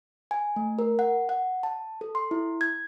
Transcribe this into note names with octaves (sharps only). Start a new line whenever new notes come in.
G#5
A3
A#4
F#5
F#5
A5
A4
C6
E4
G#6